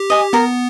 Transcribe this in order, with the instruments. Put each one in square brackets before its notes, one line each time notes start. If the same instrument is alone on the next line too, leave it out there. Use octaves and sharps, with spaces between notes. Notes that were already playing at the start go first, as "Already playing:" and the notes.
Already playing: [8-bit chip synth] G4
[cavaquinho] D#5 G#5
[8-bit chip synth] B3 [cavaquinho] A#4